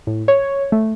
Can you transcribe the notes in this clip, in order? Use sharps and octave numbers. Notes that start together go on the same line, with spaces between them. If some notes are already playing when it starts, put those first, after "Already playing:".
A2
C#5
A3